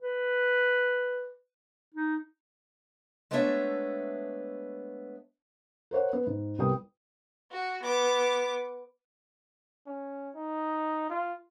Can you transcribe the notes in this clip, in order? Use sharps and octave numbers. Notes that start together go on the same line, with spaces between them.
B4
D#4
G#3 A3 B3 D4 C#5 E5
A#4 C5 C#5 F#5
B3
G#2
C2 G3 B3 A#4 G5 D#6
F#4
B3 D6
C#4
D#4
F4